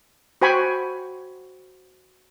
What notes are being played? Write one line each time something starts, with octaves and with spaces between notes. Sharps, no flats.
F#4 C5 G5 G#5 B5 C#6